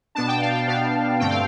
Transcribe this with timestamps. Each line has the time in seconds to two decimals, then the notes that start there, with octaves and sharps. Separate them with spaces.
0.15 B2 B3 D4 A5
0.28 G5
0.41 F5
0.54 G5
0.67 B2 B3 D4 F5
1.19 G2 D3 A3 C4 G5
1.30 F5